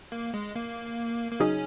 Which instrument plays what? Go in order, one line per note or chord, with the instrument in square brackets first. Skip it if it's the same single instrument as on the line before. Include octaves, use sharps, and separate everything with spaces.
[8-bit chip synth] A#3
G#3
A#3
A#3
[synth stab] C#3 F#3 D#4 G#4 [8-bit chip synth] C#4